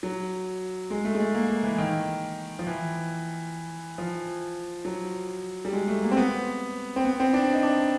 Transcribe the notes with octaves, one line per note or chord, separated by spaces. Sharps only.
F#3
G#3
A3
G#3
A3
A#3
A#3
E3
D#3
F3
E3
F3
F#3
G3
G#3
A3
A#3
C4
B3
C4
B3
C4
D4
D#4
D4